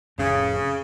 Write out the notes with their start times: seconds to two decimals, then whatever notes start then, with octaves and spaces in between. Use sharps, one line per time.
0.18 F1 F2 A2 C#3 C#4